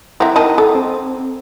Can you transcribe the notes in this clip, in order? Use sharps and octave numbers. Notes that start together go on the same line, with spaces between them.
C4 E4 E5 F#5 A#5
D#3 D#5 A5
A4
C4